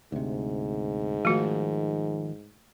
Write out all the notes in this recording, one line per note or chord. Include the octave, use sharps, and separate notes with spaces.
D2 G#2 C3
D#3 F3 A3 F#4